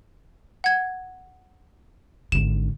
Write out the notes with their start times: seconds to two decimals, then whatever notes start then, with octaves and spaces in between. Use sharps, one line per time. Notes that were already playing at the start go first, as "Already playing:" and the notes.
0.64 F#5 G#6
2.32 G#1 D3 E7